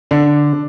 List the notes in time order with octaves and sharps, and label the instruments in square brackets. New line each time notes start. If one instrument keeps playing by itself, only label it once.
[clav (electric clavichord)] D3 [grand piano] D4